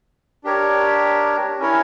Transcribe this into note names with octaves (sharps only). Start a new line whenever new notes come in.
D4 G4 A#4 C#5
C#4 E4 A#4 C#5